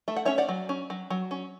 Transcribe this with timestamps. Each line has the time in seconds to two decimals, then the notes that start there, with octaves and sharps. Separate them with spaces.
0.08 A3 E5
0.17 F#5
0.25 C#4 C#5 E5
0.38 D5 F#5
0.49 F#3
0.69 C#4
0.90 F#3
1.10 F#3
1.31 C#4